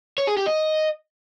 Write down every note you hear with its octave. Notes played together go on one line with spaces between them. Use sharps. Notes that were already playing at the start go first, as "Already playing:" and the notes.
C#5
G#4
G4
D#5